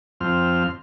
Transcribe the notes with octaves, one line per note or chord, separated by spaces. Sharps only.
F2 C4 F6